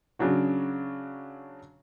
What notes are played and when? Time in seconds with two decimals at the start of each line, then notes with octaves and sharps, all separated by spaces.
0.19 C#3 F#3 D4 F#4